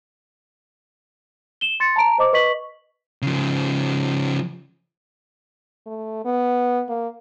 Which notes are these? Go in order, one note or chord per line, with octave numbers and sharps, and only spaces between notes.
E7 G7
C6 A6 C#7
A5 A#5 D7
C5 D#5 D6
B4 D#5 C#6 B6 F#7
C#3 F3
A3
B3
A#3